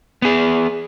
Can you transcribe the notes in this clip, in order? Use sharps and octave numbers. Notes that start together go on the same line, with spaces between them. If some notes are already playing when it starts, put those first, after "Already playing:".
B3 G#4